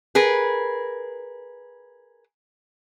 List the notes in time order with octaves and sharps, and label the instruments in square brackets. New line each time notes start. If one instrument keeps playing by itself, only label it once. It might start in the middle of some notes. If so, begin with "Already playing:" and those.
[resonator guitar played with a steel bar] G#4 A#4 B4